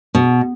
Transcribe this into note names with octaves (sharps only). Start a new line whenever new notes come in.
B2